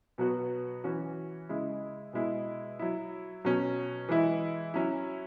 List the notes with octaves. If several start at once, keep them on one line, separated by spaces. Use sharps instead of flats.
B2 F#3 B3 F#4
E3 C#4 F#4
C#3 G#3 E4
B2 G#3 E4
F#3 E4
B2 F#3 C#4
E3 G#3 E4
F#3 C#4 E4